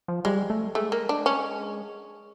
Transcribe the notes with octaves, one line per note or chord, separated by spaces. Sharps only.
F3
G3 G#3
A3
G#3 A3
A#3
D4
C#4